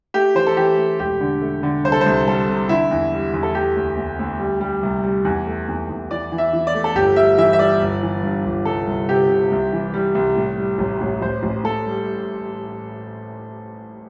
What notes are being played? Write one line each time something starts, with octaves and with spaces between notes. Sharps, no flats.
A3 G4
E3 C5
A4
E3 G4
A3
E1 G4
D3
A3
D3
C2 C5
A4
C5
C2
G3 A4
C3
D3 E4
E2
G3
E2
A4
A3 G4
D2
D2
D2
G3
G3
C2
G3
E2
A3
E2
E2
E3 D5
E3
E5
E3
D5
A3
A4
G1 G4
G3 E5
E3 E5
E5
G3 D5
G1
E3
G2
G1
C2 A4
C2
C3 G4
C3
C2
E3
G3
C2
A2
G3
A1
A1
A1 C5
A1
A1 A4
G3